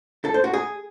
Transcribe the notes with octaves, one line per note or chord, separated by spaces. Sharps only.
A4
C5
F#4
G#4